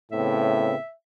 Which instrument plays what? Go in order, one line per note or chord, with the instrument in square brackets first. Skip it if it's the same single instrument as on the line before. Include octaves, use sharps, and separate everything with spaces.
[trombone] A2 [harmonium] C#3 B3 C4 [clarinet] E5